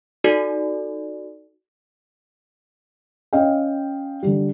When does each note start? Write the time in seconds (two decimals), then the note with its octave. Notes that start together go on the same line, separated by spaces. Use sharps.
0.24 D#4 F#4 A4 D5
3.33 C#4 D#5 F5 G5
4.23 D3 G3